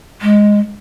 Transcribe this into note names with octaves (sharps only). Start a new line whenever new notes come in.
G#3